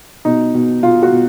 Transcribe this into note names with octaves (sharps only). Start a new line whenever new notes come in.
B2 D#4
B2
B2 F4
F#4
B2